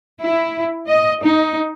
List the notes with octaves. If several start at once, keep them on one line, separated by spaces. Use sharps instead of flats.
E4
D#5
D#4